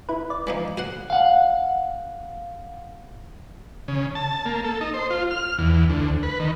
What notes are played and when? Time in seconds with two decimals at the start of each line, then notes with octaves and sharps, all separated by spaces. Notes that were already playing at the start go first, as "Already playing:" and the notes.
0.09 E4 B4
0.30 D5
0.47 E3 F3 D#4
0.77 F#4 C5 F#5
1.10 F5 F#5
3.88 C#3
4.15 A5
4.46 A#3
4.64 A4
4.81 D#4
4.94 C5
5.10 F4
5.31 F6
5.58 E2
5.90 D2
6.23 B4
6.40 D#3